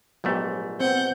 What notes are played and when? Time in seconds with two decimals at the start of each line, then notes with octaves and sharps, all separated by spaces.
0.24 A#1 G#2 F#3 A3 B3 G4
0.80 B3 C4 F#5 G6